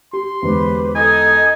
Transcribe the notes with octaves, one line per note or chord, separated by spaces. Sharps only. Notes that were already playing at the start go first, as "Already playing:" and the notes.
G4 C6
E2 D3 G#3 G4 B4 C5
D#4 A4 D#5 G#5 D#6